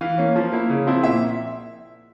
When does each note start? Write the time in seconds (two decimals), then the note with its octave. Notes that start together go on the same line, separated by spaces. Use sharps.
0.01 E3 F5
0.18 A#3 C#4
0.36 F3
0.53 A#3 E4
0.69 C#3
0.87 F3 C4 E4
1.03 A#2 E5